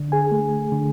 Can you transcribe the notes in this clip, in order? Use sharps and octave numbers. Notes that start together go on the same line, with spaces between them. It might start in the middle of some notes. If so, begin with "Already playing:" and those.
Already playing: D3 D4
G#4 G#5
A3
D3